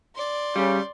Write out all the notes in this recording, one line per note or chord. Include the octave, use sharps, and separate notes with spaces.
D5 C6
C#3 G3